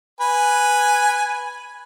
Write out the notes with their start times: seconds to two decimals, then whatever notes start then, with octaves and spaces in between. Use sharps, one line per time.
0.21 B4 G#5